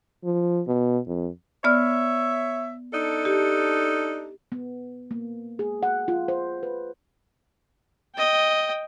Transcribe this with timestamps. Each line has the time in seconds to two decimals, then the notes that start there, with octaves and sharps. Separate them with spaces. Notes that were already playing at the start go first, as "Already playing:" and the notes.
0.24 F3
0.67 B2
1.07 F2
1.64 B3 C#5 D5 E5 F6
2.93 D4 D#4 A4
3.25 G4
4.52 B3
5.11 A#3
5.59 G#4
5.83 F#5
6.08 F4
6.28 C5
6.63 B4
8.15 D#5 G5